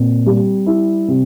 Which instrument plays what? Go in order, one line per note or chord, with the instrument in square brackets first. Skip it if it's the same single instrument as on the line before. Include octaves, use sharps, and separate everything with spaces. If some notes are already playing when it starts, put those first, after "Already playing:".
Already playing: [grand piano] A#2 C4
G3
E4
C3